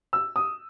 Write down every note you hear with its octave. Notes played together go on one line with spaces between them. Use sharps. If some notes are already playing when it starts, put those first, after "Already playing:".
E6
D#6